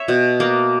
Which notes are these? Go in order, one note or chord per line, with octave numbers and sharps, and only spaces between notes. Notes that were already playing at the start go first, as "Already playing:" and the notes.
Already playing: C#5 E5
B2
A#3